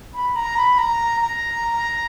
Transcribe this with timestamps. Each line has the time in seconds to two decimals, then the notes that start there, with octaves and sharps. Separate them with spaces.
0.14 B5
0.36 A#5
0.57 B5
0.78 A#5
1.21 A#5